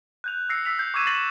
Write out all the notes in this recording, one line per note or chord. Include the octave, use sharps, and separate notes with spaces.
F#6 G6 F7
E6 A#6 C7 C#7
E6 B6 F7
G6
C#6 D6 E6 G#6 D#7 E7
A6 A#6 C7 D#7 E7 F#7